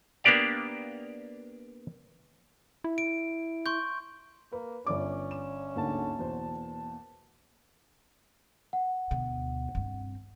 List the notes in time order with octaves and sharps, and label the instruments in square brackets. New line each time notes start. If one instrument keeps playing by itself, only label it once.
[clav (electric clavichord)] A#3 B3 D4 G4 D5 F5
[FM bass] E4
[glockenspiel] D7
C6 C#6 G6
[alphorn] A#3 [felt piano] B4
[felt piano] G1 D5 D6 [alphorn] C#4
[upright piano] E7
[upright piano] D2 G#2 D3 [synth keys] A#3 A5
[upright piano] E2 B2 C5
[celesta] F#5
[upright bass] D2 B2
G2 C4